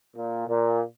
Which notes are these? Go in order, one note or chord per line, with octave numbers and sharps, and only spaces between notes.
A#2
A#2